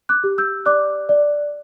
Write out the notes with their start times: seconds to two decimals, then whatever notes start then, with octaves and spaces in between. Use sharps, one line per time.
0.09 D6 F#6
0.24 G4
0.38 E6 G6
0.66 D5 D6 F#6
1.09 D5